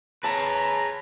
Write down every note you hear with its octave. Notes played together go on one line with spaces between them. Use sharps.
G#4 B4 C#5 A5 A#5